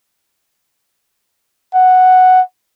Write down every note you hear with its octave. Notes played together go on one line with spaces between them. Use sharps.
F#5